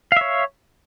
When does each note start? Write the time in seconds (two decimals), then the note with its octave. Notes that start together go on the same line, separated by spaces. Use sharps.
0.12 F5
0.17 E5
0.21 C#5